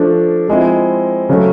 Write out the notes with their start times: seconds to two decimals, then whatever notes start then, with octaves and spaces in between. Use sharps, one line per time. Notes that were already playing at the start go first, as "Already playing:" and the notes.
Already playing: F3 A3 D4
0.48 F3 G#3 C4 E4
1.29 C#3 F#3 A3